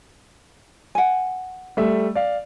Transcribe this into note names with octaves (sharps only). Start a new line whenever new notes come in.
F#5 G#5
G3 A3 E5
D5 F5